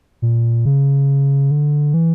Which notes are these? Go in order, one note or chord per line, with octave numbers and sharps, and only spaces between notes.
A#2
C#3
D3
E3